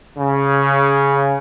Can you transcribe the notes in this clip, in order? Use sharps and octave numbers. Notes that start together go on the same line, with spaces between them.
C#3